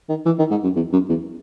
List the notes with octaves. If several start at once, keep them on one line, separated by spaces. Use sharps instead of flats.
D#3
E3
D#3
G#2
F#2
E2
F#2
E2